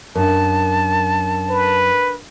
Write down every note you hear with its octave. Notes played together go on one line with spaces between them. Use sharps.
F#2 D4 A#4 A5
B4